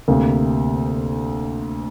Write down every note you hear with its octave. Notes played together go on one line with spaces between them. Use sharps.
D2 C3 A#3